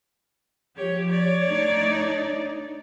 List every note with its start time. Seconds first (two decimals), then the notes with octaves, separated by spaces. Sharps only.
0.77 F3 G4 C#5
1.08 C#5 D5
1.46 A3 D4 D#4